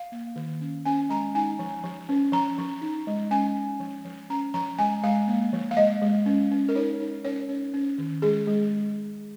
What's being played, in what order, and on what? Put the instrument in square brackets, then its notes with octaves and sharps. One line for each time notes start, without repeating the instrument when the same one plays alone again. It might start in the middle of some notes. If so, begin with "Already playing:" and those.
Already playing: [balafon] F5
A#3
D#3
C#4
C#4 G#5
G#3 A#5
D#4 G#5
F3
F3
C#4
F3 A#5
F3
D#4
G#3
C#4 G#5
C#4
F3
F3
C#4 A#5
F3 A#5
G#3 G#5
G#3 F5
A#3
F3
F5
G#3 D#5
G#3
C#4
C#4
A#4
D#4 C#5
D#4
C#4 C#5
C#4
C#4
D#3
G#3 G#4
G#3